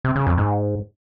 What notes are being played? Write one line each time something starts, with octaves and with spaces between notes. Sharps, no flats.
C3
C#3
F2
G#2